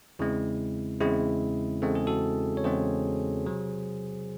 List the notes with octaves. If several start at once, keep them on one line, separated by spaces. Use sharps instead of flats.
E2 C#3 G#3 C4 E4
E2 C#3 G#3 C4 E4 G#4
E2 C#3 G#3 C4 A4
G#4
F#4 A4
C#5
E2 C#3 G#3 C4 G#4 C5
C3 F#3